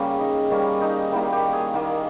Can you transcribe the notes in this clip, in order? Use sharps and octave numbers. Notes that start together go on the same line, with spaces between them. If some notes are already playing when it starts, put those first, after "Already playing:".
Already playing: C#3 G3 A#3 C#4
D#4
D#3 G3 A#3 C#4
D#4
D#3 G3 A#3 E4
G4
G#4
D#3 A#3